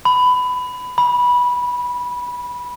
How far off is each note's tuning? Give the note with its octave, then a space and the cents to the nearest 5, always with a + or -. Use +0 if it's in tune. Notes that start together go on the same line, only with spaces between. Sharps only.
B5 +15
B5 -15